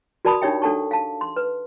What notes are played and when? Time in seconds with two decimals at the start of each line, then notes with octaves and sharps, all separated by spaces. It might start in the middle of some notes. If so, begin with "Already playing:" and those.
0.25 F#4 A#4 D5 A5 B5 D#6
0.42 D4 D#4 G4 C#5 E5 G5
0.62 D4 A4 F#5 A5 C#6
0.91 F5 A5
1.21 C6
1.36 B4